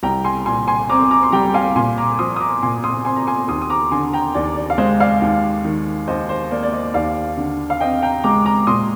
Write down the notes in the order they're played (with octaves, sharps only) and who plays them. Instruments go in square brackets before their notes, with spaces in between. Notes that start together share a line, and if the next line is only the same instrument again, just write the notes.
[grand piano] C2 G5 A#5
G#5 C6
A#2 G#5 C6
G#5 C6
C4 A#5 D6
A#5 D6
C6
G3 G5 A#5
F5 G#5
A#2 G#5 C6
A#5 D6
F3 C6 D#6
D#6
A#5 D6
A#2 G#5 C6
C6 D#6
C4 G#5 C6
A#5
G#5 C6
D#2 C6 D#6
D#6
A#5 D6
D3 G#5 C6
G5 A#5
D#2 D5
D5
F5
G#3 C5 D#5
D5 F5
D#2
D#3
D#2 C5 D#5
C5
A#3 D5
D5
C5 D#5
D#2 D5 F5
D3
F5
C4 D#5 G5
G5 A#5
G#3 A#5 D6
A#5 D6
A#2 C6 D#6